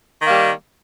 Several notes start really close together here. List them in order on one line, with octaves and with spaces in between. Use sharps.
D#3 A#3 G3